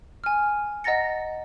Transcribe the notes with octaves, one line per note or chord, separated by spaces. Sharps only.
G#5 F6
D#5 F#5 A#5 A6 A#6 C#7